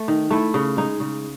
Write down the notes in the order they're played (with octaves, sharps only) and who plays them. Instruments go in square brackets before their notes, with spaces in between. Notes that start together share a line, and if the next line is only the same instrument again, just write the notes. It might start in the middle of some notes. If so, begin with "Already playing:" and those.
Already playing: [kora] A3
D#3
A3 E4
C#3
G#3 D#4
C#3